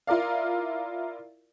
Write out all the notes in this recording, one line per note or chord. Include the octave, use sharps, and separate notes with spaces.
E4 F4 A#4 D5 F5